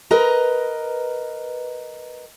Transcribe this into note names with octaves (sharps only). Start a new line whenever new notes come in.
A#4 B4 D#5 A#5